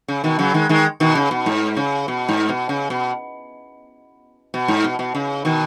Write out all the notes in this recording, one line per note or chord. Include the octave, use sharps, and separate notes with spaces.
C#3
B2 D#3
C#3 F#3
D#3 G#3
D#3 G#3
B2 D#3
C#3
B2
G#2
C#3
B2
G#2
B2
C#3
B2
B2
G#2
B2
B2
C#3
B2 D#3